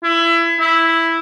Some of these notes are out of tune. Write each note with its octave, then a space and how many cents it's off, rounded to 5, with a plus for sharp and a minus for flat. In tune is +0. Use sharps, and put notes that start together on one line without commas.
E4 +25
E4 +0